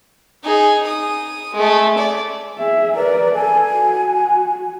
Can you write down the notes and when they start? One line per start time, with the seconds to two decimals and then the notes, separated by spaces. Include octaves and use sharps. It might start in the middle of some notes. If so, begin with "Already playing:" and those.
0.44 D#4 G#4
0.87 D#6
1.53 G#3 A3
1.98 D5
2.58 G#4 E5
2.96 A#4 B4 D5
3.34 A4 G#5
3.72 F#4